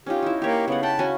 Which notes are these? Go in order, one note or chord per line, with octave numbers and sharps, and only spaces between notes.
C#4 D#4 F4 G4
D#4 E4
A#3 G4 C#5
C#3 B3 G4 F#5
F#5 G5 A5 B5
C#4 F#4 G#5